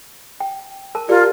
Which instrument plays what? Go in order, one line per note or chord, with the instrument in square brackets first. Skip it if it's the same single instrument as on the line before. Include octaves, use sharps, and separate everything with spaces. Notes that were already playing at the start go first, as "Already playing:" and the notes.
[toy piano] G5
A#4 A5
[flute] F4 [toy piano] G4 D5 [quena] A#4